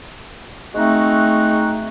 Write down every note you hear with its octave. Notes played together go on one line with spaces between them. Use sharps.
G#3 A3 C4 D#4 F#4